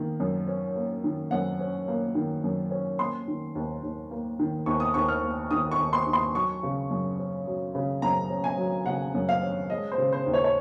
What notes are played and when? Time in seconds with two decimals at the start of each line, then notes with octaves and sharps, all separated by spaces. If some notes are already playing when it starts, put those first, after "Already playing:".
Already playing: D#3 A#3
0.20 F#2
0.48 C#4
0.75 A#3
1.04 D#3
1.31 F#2 F#5
1.60 C#4
1.88 A#3
2.15 D#3
2.44 F#2
2.71 C#4
2.99 A#3 C6
3.28 D#3
3.55 D#2
3.83 D#2
4.11 A#3
4.39 D#3
4.66 D#2 C#6
4.80 D#6
4.94 D#2 C#6
5.08 F6
5.23 A#3
5.51 D#3 D#6
5.72 C#6
5.78 D#2
5.93 C6
6.07 D#2
6.13 C6
6.34 F#3 C#6
6.63 C#3
6.91 F#2
7.18 C#4
7.47 F#3
7.75 C#3
8.02 F#2 A#5
8.30 C#4
8.44 G#5
8.58 F#3
8.86 C#3 F#5
9.14 F#2
9.29 F5
9.42 C#4
9.70 G#3 D#5
9.92 C5
9.98 C#3
10.13 C5
10.26 D#2
10.33 C#5
10.44 C#5